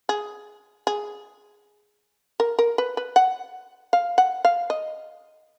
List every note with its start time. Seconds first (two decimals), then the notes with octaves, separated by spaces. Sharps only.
0.09 G#4
0.87 G#4
2.40 A#4
2.59 A#4
2.78 B4
2.97 B4
3.16 F#5
3.93 F5
4.18 F#5
4.45 F5
4.70 D#5